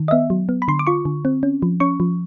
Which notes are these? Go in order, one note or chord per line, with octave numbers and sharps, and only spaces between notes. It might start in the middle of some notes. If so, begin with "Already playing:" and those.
Already playing: D#3
D#5
B3 E5
F#3
B3
B5
D3 C6
D6
F4 C#6
D3
C4
C#4
F3
C#4 C#6
F3